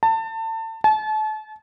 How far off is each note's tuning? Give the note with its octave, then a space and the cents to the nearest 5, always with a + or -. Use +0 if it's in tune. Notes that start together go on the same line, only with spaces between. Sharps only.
A5 +30
A5 -35